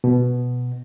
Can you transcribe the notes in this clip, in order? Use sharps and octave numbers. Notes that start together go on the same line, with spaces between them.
B2